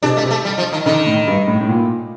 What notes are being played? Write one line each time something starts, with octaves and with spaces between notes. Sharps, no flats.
C3 D4
A3
C3
A3
G3
F3
D#3
D3 D#3
A2
G2
A2
A2
A#2